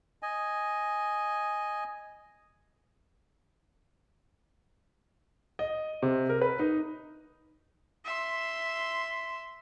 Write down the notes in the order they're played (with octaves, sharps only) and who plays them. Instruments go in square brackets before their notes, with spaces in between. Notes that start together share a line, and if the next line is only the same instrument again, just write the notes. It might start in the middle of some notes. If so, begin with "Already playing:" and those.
[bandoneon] D#5 G#5
[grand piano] D#5
C3
A#4
B4
D#4
[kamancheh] E5 C6